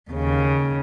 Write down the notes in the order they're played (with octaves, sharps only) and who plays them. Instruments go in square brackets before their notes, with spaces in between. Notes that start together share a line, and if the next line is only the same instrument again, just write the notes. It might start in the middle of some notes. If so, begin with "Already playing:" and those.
[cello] D#2 C#3